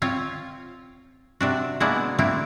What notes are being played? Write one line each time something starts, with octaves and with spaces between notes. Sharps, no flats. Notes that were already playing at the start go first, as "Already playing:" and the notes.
C4 F4 C#5
C3 D4 F#4
G#3 A#3 B3 D4 E4 F#4
A3 A#3 C4 D4 E4